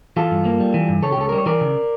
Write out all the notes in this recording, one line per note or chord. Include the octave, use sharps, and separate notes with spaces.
E3 F4 A4
G2
A#3
G3
E3
G2
C#3 A4 C#5
G4
C#2 A4
A#4
G3
C#5
E3 A#4 D5
C#3